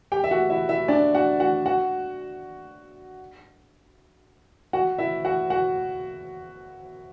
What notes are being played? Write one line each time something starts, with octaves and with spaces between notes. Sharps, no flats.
G4 G5
E5
F#4 F#5
E4 E5
E4 E5
D4 D5
F#4 F#5
F#4 F#5
F#4 F#5
F#4 F#5
E4 E5
F#4 F#5
F#4 F#5